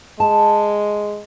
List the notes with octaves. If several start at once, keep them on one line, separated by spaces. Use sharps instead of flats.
G#3 A5